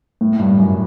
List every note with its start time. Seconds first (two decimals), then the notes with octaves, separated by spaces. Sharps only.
0.21 A2
0.39 G2
0.58 F#2